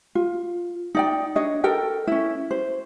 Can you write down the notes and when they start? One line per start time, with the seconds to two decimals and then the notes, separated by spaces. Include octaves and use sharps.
0.15 F4
0.95 D#4 D5 G5
1.35 D4 C#5 D#5
1.64 A4 A#4 G5
2.07 C#4 E4
2.51 C5